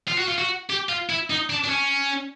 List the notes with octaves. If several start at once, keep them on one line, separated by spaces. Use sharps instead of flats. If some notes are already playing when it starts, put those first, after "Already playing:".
F4
F#4
F4
F#4
G4
F4
E4
D#4
D4
D4
C#4